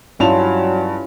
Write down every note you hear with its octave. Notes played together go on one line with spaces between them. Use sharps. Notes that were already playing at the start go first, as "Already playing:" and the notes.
G2 F#3 C#4 E4 F4 A5 F7